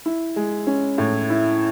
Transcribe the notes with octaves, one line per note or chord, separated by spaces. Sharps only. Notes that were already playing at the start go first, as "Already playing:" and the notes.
E4
G#3
C#4
A2
E4